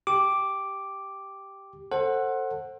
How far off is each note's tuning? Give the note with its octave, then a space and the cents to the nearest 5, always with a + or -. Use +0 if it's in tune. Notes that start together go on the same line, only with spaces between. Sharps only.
G4 +0 D6 +0
A4 +25 C5 +25 F#5 +0